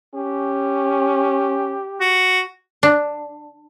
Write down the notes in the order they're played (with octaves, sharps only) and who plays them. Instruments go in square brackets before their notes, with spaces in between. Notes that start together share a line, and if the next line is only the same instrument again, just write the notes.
[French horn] C#4 [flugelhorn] G4
[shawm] F#4
[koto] D4